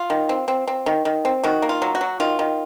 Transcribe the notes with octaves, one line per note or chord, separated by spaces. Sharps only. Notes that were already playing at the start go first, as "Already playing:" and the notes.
Already playing: F4
D#3
C4
C4
C4
D#3
D#3
C4
D#3 F#4
A#3
F4
F#3
F#4
F#3
D#3 F4
D#3